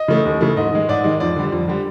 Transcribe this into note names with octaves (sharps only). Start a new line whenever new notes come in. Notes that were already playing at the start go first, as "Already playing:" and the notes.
Already playing: D#5
C#3 E3 A3
D#2
C#3 E3 A3
G#2 D#5
D#3 G#3
G#2 D5
D#3 G#3
F2 D5
D3 G3
F2
D3 G3